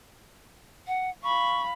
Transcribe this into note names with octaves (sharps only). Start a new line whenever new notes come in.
F#5
F5 B5 C#6